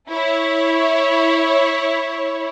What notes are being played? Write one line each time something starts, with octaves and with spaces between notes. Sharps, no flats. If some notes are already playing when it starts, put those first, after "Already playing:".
E4 C#5